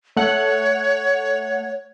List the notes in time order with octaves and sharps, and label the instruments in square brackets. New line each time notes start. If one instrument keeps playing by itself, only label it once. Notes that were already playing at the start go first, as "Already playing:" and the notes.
[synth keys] A3 F#5 [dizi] C#5